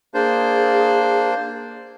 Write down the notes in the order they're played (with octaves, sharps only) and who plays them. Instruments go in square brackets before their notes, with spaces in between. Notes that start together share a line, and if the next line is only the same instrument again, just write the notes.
[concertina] A#3 D4 C5 [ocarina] G#4